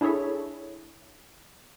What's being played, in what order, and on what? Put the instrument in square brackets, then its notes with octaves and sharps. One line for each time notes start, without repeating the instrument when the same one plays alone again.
[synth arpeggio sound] D4 E4 G#4 A4 C#5 E5